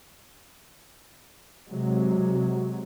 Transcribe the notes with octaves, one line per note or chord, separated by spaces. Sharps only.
C3 F#3 G#3